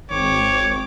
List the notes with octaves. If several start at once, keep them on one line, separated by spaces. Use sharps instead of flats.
G#1 C4 C#5 D6